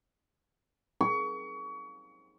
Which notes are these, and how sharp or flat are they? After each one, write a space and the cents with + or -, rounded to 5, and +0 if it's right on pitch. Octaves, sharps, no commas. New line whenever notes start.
C#6 +30